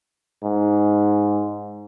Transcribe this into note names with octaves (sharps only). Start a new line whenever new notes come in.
G#2